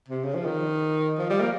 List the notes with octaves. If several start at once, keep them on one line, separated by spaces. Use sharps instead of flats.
C3
C#3
F3
D#3
F3
G3
A#3